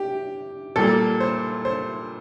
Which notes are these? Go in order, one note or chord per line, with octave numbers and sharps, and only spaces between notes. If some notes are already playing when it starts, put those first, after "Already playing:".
Already playing: G4
A#2 G3 A#3 A4
C5
C5